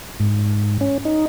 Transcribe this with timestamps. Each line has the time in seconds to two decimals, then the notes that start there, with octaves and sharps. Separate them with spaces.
0.20 G#2
0.81 C#4
1.05 D#4